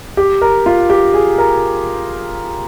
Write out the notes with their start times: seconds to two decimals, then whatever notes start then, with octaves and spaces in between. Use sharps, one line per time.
0.17 G4
0.42 A#4
0.66 F4
0.90 G4
1.14 G#4
1.38 A#4